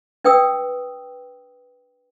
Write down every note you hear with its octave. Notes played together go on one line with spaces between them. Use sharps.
D4 B4 G5 D#6 E6